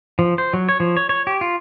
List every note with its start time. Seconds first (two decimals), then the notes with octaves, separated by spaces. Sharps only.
0.19 F3
0.38 C5
0.53 F#3
0.69 C#5
0.80 F3
0.97 C#5
1.09 C#5
1.27 G4
1.41 F4